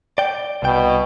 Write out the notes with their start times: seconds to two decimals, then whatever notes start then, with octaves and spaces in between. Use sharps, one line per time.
0.18 D5 G5
0.63 C2 B2 G5